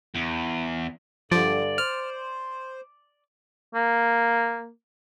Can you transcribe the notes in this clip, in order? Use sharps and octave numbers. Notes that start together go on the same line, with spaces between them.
E2
G2 D3 F3 D5
C5 F6
A#3